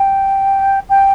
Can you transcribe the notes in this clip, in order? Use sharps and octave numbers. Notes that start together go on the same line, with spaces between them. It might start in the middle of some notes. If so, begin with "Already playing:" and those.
Already playing: G5
G5